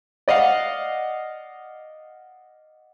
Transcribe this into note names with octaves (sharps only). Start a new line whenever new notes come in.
D5 D#5 F5 F#5